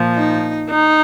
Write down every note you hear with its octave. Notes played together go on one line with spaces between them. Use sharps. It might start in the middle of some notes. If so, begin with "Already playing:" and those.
Already playing: A#2 F3
D#4
D#4